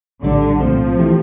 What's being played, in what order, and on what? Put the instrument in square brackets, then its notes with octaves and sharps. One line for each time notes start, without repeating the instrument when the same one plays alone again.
[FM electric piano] A#1 A2 G3 D4 [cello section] D3
[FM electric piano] C2 A#2 A3 C4 [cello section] F3
[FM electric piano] E3 A3 E4 G4